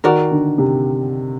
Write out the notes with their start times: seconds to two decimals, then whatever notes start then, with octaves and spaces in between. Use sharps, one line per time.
0.04 D#3 F#4 A#4 D5
0.31 D3
0.58 C3